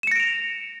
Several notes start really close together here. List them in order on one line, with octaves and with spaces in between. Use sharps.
E7 C#7 A#6 D7 F7